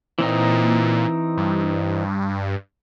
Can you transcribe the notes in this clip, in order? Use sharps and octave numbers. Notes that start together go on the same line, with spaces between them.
A#2 E3 C4 D#4
G2